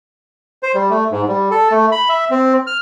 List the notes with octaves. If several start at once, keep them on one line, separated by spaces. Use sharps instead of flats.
C5
G3
A3
G#2
G3
A4
A3
B5
E5
C4
F6